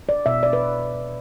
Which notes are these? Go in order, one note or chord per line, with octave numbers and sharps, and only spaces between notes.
D5
B2 E5
D5
B4